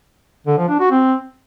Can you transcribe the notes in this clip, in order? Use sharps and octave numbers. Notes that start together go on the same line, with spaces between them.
D3
F3
D4
F#4
C4